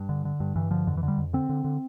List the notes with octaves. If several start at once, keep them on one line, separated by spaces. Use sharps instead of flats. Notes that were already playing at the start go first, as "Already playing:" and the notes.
Already playing: G2
D3
D3
G2
G2 E3
D3 F3
F2 D3
E3
D3
G3
F2
D3 C4
D3
D3